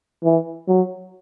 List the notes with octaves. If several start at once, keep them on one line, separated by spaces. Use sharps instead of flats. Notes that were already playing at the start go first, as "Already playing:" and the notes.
E3
F#3